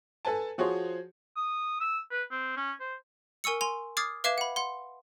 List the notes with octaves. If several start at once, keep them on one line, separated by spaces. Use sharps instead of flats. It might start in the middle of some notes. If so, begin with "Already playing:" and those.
A4 B4 G#5 A5
F3 F#4 G#4 C5 C#5
D#6
E6
B4
C4
C#4
C5
A#4 G#5 C#6 E6 C#7
G#5 C6 F7
D6 D#6 F6 G#6 A6 C7
B4 E5 F5 D6 G#6 E7
F#5 B5
F#5 C6